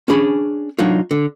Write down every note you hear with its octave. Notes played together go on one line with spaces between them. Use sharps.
C#4 D4 G#4 B5
F#3 D4 D#4 F4
D3